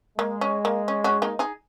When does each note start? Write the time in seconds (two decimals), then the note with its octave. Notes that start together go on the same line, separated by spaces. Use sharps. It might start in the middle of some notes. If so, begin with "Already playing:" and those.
0.18 G#3 A#3
0.41 C#4
0.65 A#3
0.88 C#4
1.04 C#4 F#4
1.22 A#3 D#4
1.39 D#4 G#4